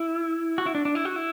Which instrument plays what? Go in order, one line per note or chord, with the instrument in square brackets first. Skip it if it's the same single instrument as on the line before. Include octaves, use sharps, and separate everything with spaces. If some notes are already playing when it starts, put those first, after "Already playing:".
Already playing: [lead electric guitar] E4
F#4
E4
D4
D4
E4
F#4
E4